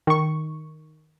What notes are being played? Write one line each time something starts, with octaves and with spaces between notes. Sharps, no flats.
D#3 C#6